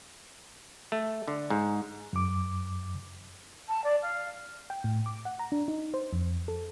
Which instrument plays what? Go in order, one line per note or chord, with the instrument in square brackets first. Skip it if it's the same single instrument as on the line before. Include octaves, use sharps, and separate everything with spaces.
[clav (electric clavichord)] A3
D3
G#2
[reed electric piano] F#2 D6
[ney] A5
D5
F5
[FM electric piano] G5
A2
D6
F#5
A#5
D4
D#4
C5
F2
A4